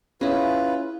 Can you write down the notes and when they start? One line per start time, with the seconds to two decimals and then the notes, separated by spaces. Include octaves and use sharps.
0.21 C#4 E4 F4 G#4 B4